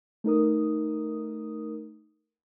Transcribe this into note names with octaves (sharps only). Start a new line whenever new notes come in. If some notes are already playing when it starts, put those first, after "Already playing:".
A3 D#4 A#4 D#6